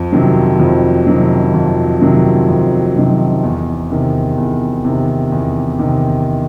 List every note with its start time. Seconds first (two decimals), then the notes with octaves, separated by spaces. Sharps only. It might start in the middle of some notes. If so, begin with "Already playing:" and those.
Already playing: F2
0.13 C3 D#3 F#3
0.60 F2
1.07 C3 D#3 F#3
1.54 F2
2.02 C3 D#3 F#3
2.49 F2
2.96 C3 D#3 F#3
3.43 E2
3.90 C3 D#3
4.37 E2
4.85 C3 D#3
5.32 E2
5.79 C3 D#3